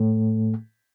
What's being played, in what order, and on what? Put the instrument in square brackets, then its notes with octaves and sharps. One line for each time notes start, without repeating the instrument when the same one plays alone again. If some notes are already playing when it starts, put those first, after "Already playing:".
Already playing: [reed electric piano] A2 A3